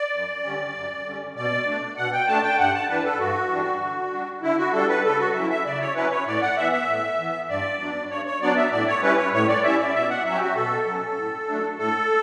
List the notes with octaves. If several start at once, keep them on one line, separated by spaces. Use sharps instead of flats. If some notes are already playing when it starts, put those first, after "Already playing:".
Already playing: D5
F#2
D3 G3 C#4
F#2
D3 G3 C#4
B2 D5
A3 D4
B2 F#5
G5
A3 D4 A5
G5
G2 F#5
A5
E3 G3 D4 B4
A4
G2 F#4
E3 G3 D4
D3
G3 D4
D3 E4
F#4
G3 D4 A4
B4
C#3 A4
F#4
F#3 C#4 E4 E5
E5
C#3 D5
C#5
F#3 C#4 E4 B4
C#5
A2 D5
F#5
E3 B3 E5
E5
A2
E3 B3
G2 D5
F#3 B3 D4
G2 C#5
C#5
F#3 B3 D4 D5
E5
A2 D5
C#5
G3 C#4 E4 B4
C#5
A2 C#5
D5
G3 C#4 E4 E5
D5
B2 E5
F#5
F#3 C#4 E5
G4
F#4
B2 A4
F#3 C#4
A2
F#3 A3 D4
A2 A4